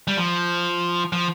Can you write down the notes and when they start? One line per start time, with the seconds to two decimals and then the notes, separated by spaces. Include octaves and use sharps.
0.08 G3
0.17 F3
1.12 F3